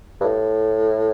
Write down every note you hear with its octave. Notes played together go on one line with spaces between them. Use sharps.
G2
A2